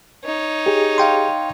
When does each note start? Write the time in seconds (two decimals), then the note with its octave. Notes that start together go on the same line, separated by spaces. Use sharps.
0.24 D#4 C#5
0.66 G4 G#4
0.98 F5 G5 C6